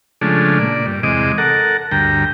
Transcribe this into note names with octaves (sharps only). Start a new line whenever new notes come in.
C#3 F3 G#3 A3 D4
A#2 D5
G2
E2 C3 G#3 D#5 D6
A4 A#4 F#5
D2 G2 G5 A#5